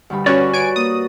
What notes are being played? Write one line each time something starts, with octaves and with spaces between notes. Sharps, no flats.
D2 G2 B5
C#4 F#4 B4 D5
C#5 G#5 D7
A#3 D#6